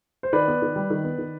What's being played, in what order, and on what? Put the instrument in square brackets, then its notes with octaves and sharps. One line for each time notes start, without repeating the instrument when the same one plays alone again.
[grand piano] C5
[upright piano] D#3 [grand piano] B4 D5
[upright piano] B3
D#3
G3
D#3
B3
D#3